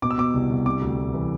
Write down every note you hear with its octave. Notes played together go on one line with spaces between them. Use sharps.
B2 D6
E6
B2 D6
C2
C2
C3 D6
D2
D2
E3